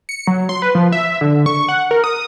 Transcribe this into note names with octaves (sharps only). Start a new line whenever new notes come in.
C#7
F#3
C6
B4
F3
E5
D3
C#6
F#5
A#4
D#6